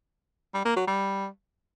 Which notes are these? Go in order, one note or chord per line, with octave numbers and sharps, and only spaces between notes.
G3
A#3
F#3
G3